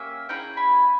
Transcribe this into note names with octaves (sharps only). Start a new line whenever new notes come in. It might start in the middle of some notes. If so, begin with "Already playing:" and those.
Already playing: A#3 C#4 G4 E5 G#5
C#4 E4 G#4 G5 A#5
G#5 B5